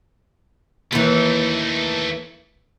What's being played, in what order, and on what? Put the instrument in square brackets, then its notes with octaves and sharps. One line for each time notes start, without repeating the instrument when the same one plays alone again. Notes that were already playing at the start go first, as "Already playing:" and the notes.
[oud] D#2 E3 [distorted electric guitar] A3 D#4